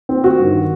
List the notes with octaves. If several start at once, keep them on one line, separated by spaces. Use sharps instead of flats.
C4
F#4
G2 D#3